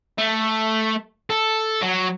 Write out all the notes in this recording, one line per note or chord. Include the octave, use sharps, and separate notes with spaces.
A3
A4
F#3